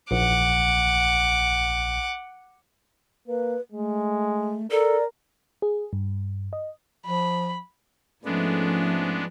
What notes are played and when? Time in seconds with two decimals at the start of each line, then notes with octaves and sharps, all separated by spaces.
0.11 A#1 F#5 D6
3.28 A#3 B4
3.72 G#3 A3
4.71 A4 A#4 D5
5.62 G#4
5.93 G2
6.53 D#5
7.06 F3 B5
8.25 G#2 F3 G#3 A3 B3 C#4 D4